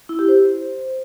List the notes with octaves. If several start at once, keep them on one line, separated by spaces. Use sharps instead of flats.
E4
G4
C5